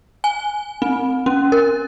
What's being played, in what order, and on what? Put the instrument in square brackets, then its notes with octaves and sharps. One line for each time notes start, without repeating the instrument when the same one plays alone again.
[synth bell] G#5
C4
C#4
A#4